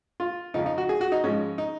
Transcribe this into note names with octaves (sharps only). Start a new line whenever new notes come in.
F4
F2 C#3 F3 D#4
D#4
F#4
G#4
F#4
D#4
G#2 F3 G#3 C#4
D#4